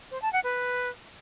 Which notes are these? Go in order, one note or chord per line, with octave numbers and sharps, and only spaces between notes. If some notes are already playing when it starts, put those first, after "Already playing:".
C5
A5
F#5
B4